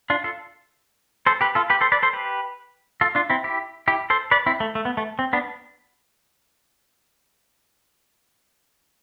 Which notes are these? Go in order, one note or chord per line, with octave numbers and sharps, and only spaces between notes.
D4 F4
F4 A4
A4 C5
G4 B4
F4 A4
G4 B4
A4 C5
B4 D5
A4 C5
G4 B4
F4 A4
D4 F4
C4 E4
E4 G4
E4 G4
A4 C5
B4 D5
C4 E4
A3
A3
B3
A3
C4
B3 D4